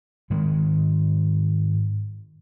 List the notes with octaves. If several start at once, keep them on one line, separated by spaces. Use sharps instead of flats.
G#2 D#3 G#3